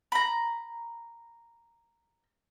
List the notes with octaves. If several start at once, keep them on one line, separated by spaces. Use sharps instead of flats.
A#5 B5